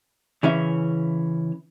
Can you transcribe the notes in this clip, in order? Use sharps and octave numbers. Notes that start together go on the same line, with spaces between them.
C#3 E3 C#4 E5